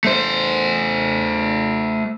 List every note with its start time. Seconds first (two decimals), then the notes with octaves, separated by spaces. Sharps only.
0.05 A3 C5